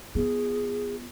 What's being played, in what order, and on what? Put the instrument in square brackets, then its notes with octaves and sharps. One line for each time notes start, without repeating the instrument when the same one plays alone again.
[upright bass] B3 F4 [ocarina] G#4